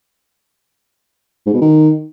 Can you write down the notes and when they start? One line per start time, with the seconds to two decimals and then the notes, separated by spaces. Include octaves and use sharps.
1.46 G#2
1.54 B2
1.61 D#3